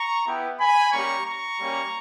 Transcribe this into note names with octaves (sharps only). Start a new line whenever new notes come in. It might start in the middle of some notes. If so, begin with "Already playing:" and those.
Already playing: A#5 C#6
B3 E4 G4
G#5 B5
G3 A#3 C#4 G4 A#5 C#6
A#5 C#6
G3 A#3 C#4 G4